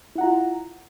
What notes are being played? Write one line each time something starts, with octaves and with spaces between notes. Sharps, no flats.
E4 F4 F#5 A#5